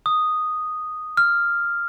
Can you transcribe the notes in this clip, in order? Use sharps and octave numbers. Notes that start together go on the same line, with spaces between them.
D#6
F6